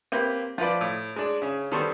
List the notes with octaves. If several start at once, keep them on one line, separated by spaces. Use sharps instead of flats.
A#3 C4 G4 B4
F3 F4 B4 D5
A2
G#3 D4
C#3 C#4
D#3 G3 B3 A4 C5 C#6